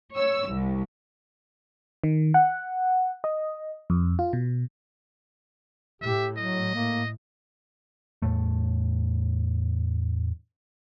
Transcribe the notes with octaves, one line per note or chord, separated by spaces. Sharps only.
C#5 E6
C2
D#3
F#5
D#5
F2
F4
B2
A2 G4 E5
F#3 D#5
A#3
E2 A2 A3